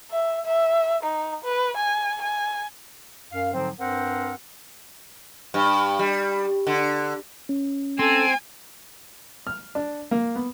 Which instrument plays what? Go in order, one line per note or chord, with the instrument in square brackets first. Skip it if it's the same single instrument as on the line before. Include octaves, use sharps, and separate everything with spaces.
[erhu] E5
E5
D#4
B4
G#5
G#5
[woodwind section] F#2 F5
G#2 D3 F3 F#3 C4
G2 C4 A#4 C5 F#5
[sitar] G2
G3
D3
[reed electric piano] C#4
[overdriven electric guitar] C4 [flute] A4 [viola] G#5
[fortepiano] F6
D4
A#3
B3